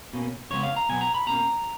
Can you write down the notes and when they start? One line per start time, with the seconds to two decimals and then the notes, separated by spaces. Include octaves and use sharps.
0.13 B2 A#3 C#4
0.50 F2 C#3 G#3 B3 C#5
0.63 F5
0.76 A#5
0.89 B2 F#3 B3 G#5
1.01 A#5
1.14 B5
1.26 B2 A#3 C#4 A#5